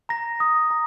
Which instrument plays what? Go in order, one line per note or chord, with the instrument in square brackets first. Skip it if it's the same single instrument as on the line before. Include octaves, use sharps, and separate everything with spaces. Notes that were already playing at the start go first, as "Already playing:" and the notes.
[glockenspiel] A#5 A#6
D#6
A#5